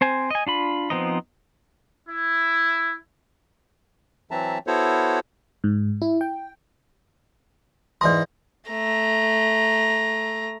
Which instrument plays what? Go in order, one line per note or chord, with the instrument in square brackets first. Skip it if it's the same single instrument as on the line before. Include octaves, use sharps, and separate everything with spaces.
[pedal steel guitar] C4 C5 G#5
D#5 G#5
D4 F4 B5
F3 B3 C4 D#4 D#5
[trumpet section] E4
[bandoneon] E3 F#3 C4 E5 A5 A#5
B3 E4 F#4 A4 C5 C#5
[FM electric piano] G#2
E4
G5
[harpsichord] G#2 E3 D#5 [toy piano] D5 C6
[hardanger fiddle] A3 A#5